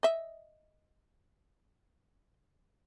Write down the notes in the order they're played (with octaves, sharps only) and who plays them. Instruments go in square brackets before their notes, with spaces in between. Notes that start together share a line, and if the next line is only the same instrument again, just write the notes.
[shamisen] D#5 E5